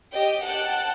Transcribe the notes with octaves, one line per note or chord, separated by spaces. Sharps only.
G4 D#5 G5
F#5 G5 A5 F#6